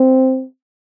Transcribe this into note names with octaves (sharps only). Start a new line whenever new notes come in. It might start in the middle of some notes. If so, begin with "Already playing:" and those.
Already playing: C4